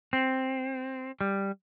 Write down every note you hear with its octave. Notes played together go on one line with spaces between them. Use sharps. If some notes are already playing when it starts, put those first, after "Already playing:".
C4
G3